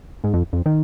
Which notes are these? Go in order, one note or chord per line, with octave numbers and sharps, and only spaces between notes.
G#2
F2
F2
D#3